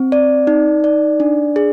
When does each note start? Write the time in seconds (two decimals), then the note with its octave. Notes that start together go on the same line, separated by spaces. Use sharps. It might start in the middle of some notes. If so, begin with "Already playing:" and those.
Already playing: C4
0.12 D5
0.47 D#4
0.84 D5
1.20 D4
1.56 G#4